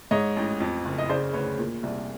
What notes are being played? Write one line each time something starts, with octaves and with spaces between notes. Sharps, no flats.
G#2 C#5 D#5
A1
F2
F#1
D#5
C#3 C5 D5
D2 B4 C#5
A#2
C2